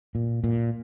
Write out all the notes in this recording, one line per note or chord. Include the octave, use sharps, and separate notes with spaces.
A#2
A#2